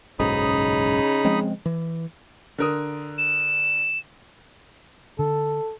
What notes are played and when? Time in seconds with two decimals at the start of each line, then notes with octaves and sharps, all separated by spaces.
0.19 F#1 B1 G#2 C#3 D#4 B5 D#6
1.25 F3 G#3 C4
1.66 E3
2.58 D3 A#4 D#6
3.18 E7
5.19 D3 A4